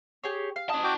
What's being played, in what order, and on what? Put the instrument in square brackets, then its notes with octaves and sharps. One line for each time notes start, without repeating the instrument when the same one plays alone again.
[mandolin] G4 G#4 C#5
F5
[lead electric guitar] C#4 A5 [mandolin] D#5
[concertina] F#4 G5 D6